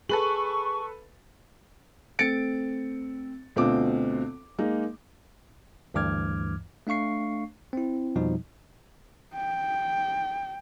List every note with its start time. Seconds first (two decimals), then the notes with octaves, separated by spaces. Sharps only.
0.09 G#4 A4 B4 C#6 F#7
2.19 A3 C4 A6 C#7 D7
3.56 D2 B2 C4 F4 D6
4.58 G#3 A#3 D#4
5.94 D2 G2 E3 D6 F6 G#6
6.87 A3 D4 F5 C#6 C7
7.73 C4 E4
8.16 F2 B2 F3 G3 D#4
9.35 G5